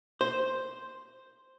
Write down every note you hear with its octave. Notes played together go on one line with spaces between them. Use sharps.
C5